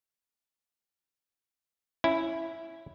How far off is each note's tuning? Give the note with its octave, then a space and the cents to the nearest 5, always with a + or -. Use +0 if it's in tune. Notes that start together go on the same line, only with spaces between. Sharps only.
C#4 +0 E4 +0